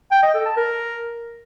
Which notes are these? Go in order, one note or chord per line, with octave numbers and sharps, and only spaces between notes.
G5
D#5
A4
A5
A#4